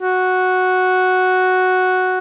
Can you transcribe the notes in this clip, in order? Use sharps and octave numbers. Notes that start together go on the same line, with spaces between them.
F#4